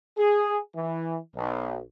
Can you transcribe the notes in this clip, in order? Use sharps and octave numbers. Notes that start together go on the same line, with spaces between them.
G#4
E3
B1